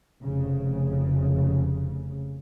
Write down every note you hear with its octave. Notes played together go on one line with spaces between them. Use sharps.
F1 C#3